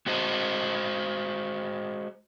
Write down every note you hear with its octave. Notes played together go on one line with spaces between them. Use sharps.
G#3 F#4 C5 D#5